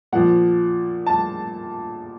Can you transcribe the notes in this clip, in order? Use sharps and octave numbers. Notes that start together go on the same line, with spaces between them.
A#2 F3 F#5
A5